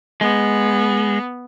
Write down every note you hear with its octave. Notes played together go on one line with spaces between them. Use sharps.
G#3 B3